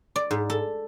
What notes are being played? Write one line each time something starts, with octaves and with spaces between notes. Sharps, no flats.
D5
G#2
A4